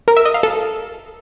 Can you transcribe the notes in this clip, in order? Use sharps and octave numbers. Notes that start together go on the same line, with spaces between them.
A#4
E5
D#5
F5
A4